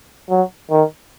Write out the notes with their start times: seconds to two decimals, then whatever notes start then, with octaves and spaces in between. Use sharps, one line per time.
0.30 F#3
0.71 D#3